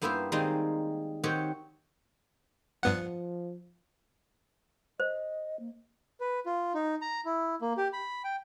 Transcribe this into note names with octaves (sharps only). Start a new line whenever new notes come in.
G2 A#3 B3 E4 C5 E5
D#3 G3 G#3 A#3 C4 D#4
D#3 C4 F#4 G4 C#5
G2 F3 B3 F#5
C5 D#5
A#3
B4
F4
D#4
A#5
E4
A#3
G4
B5
G5